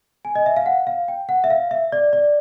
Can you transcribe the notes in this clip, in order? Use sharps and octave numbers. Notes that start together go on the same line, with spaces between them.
G#5
D#5
E5
F5
F#5
F5
G5
F#5
E5
F5
E5
D5
D5